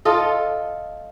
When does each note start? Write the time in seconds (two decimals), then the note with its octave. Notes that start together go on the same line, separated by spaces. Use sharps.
0.05 F4 A4 D#5